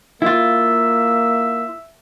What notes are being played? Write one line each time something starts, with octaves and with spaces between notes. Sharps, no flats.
A#3 E4 F4 E5